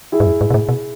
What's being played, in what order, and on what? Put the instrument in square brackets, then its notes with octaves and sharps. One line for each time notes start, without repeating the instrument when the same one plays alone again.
[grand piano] E4 G#4
[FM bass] G#2
F#2
G#2
B2
A2
B2